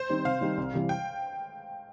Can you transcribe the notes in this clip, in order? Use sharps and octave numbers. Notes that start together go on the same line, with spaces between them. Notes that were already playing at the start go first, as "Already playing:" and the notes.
Already playing: C5
D#3 G3 C4 D#4
C3 F5
D#3 G3 C4 D#4
C2
C3 E3 G3
G5